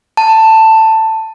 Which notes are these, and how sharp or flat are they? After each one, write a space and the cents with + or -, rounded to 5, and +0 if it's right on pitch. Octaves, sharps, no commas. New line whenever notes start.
A5 +10